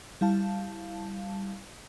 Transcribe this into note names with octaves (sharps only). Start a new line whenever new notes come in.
G3 E4 F5 A5